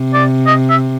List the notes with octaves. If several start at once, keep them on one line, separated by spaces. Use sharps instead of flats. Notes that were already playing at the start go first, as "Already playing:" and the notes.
Already playing: C3
D5
D#5
E5